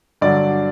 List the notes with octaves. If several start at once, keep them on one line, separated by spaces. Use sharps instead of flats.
G2 D3 F#3 D5